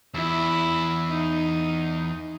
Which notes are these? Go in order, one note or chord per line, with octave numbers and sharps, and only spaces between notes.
E2 E4
D#4